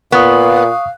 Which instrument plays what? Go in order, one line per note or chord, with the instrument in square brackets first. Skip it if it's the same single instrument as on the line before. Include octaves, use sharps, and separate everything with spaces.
[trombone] A#2 [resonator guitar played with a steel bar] B3 [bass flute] F5 [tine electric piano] C#6 D#6